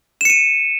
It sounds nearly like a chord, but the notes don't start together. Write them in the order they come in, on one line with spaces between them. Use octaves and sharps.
E7 C#7 D#7